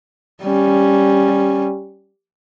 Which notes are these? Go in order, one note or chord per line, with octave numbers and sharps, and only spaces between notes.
G3 C#4